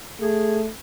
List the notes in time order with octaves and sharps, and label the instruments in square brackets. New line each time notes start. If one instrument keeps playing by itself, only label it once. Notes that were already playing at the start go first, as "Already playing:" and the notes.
[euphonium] A3 [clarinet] G#4